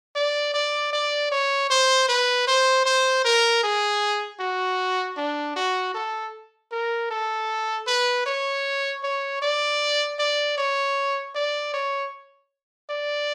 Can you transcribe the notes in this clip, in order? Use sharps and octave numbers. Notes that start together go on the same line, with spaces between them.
D5
D5
D5
C#5
C5
B4
C5
C5
A#4
G#4
F#4
D4
F#4
A4
A#4
A4
B4
C#5
C#5
D5
D5
C#5
D5
C#5
D5